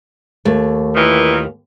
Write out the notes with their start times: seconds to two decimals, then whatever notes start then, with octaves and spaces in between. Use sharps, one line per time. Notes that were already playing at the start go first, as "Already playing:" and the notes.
0.45 D#2 A3
0.95 A#2 D#3 E3